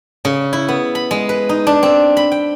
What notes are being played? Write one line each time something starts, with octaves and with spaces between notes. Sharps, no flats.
C#3
E4
B3
B5
G#3
B4
D#4
D4
C4
B5
G5